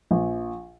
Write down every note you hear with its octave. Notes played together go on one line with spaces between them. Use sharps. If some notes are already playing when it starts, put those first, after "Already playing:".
A#1